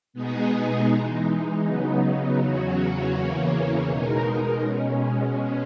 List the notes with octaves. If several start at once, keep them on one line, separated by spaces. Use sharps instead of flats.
B2 G#3 B3 D#4 G#4
E3 G#3 D#4
C#3 F#3 B3 D#4
E2 C#3 F#3 C#4 F#4
E2 C#3 E3 A#3 C#4
B2 G#3 D#4 A#4
B2 G#3 C#4